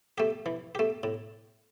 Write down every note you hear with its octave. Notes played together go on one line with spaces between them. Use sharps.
A3 G4
E3
A3 G4
A2